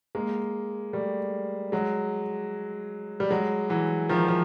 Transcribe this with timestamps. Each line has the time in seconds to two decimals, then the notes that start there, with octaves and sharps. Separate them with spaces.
0.15 G#3 A#3
0.93 G3 A3
1.72 F#3 G#3
3.20 G3
3.31 F#3 G#3
3.70 E3 F#3
4.09 D#3 F3
4.28 F3